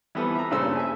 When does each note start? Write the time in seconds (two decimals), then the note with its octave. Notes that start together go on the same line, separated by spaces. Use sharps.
0.15 E3 F3 G3 B3 A4 B4
0.35 E5 A#5
0.51 G2 A#2 C#3 A4 C5 E6
0.76 E5 G#5